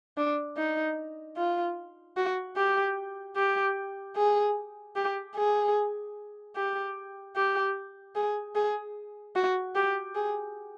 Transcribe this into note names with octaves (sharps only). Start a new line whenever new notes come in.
D4
D#4
F4
F#4
G4
G4
G#4
G4
G#4
G4
G4
G#4
G#4
F#4
G4
G#4